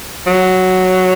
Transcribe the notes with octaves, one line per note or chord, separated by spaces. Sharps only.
F#3